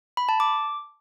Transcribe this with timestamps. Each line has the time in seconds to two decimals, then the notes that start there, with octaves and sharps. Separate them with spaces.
0.17 B5
0.29 A5
0.40 D6